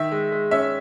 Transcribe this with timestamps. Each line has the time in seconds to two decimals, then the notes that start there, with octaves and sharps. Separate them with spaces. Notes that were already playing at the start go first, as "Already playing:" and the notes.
Already playing: D#3 E5
0.11 G#3
0.32 G#3
0.51 C#4 E5